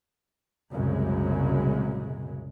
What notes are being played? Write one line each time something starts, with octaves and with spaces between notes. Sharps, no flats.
C2 F#2 A#2 C#3 G#3